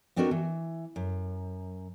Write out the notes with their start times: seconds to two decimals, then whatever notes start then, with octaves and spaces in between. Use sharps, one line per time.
0.16 B3 C4 D4 D#4 F#4 A#4
0.31 E3
0.96 F#2